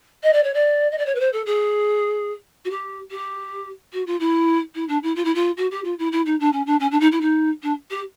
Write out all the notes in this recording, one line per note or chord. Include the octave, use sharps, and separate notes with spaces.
D#5
D5
C#5
D5
D#5
D5
C#5
B4
C5
A4
G#4
F#4
G4
G4
F#4
F4
E4
E4
D4
E4
F4
E4
F4
F#4
G4
F4
E4
E4
D#4
D4
C#4
D4
C#4
D4
D#4
E4
D#4
D4
G4